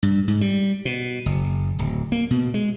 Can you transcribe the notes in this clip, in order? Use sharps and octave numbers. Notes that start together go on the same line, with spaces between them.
G2
G#2
G3
B2
F#1
D1
A#3
B2
G#3